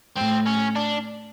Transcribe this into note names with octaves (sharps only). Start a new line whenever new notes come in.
A2 C4
C#4
D4